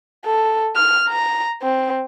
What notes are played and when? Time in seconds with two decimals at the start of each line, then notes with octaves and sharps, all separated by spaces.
0.25 A4
0.76 F6
1.09 A#5
1.62 C4